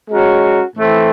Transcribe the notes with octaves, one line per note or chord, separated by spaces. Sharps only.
G#3 C#4 F#4 A#4
A2 E3 A3 C4